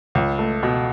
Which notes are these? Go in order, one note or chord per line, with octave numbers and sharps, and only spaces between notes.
C#2
A3
B2